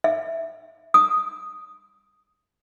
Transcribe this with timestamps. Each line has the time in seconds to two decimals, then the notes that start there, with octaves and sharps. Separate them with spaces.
0.04 E5
0.94 D#6